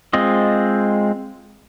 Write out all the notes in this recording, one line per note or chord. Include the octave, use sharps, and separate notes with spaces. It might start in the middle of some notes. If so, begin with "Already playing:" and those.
G#3 C4 F4 D#5